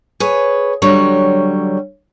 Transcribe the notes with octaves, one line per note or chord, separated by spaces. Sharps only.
G#4 B4 C#5
D3 F#3 G3 C#5